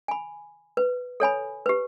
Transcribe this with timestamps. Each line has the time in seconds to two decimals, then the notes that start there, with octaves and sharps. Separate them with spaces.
0.08 G#5 B5
0.77 B4
1.20 A4 C#5 G#5 B5
1.66 G4 B4